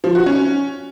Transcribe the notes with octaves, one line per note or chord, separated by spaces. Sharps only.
F3
F#4
C#4